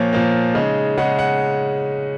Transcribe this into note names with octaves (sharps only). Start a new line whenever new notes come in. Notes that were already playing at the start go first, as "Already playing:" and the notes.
Already playing: A#2 F3 A#3 C#5
A#2 F3 A#3
C#3 G#3 D#4
C#3 G#3 D#4 F#5
F#5